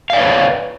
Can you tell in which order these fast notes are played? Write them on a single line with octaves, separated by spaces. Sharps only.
F5 D5 C#5 B4